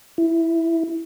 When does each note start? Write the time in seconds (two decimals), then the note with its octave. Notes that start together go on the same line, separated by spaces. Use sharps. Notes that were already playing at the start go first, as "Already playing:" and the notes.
0.18 E4